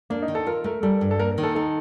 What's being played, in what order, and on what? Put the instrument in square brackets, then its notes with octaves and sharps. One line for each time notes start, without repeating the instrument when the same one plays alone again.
[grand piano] A#3 [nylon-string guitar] D4
[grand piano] D#4
[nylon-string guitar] D#3
[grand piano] A4
[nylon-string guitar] F4 [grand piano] A#4
[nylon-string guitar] A3 [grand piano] A#4
[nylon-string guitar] G3 [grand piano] A4
[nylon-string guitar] G2
[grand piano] A4
[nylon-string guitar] A#3 [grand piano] A#4
[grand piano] A#4
[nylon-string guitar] D#3
[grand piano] A4
[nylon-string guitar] D#4 [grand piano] A4